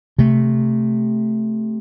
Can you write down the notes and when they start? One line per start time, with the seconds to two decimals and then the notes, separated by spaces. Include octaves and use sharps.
0.19 C3 A3